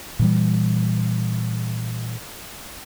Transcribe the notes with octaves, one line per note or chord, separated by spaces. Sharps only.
A#2 E3 G3